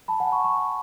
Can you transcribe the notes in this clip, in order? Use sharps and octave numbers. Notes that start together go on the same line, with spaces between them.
A5 B5
F#5 G#5
B5 C#6
B5 C#6